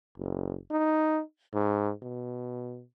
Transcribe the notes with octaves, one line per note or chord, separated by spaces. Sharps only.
F#1
D#4
G#2
B2